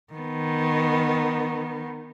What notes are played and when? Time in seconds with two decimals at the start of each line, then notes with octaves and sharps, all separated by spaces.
0.13 D#3 B3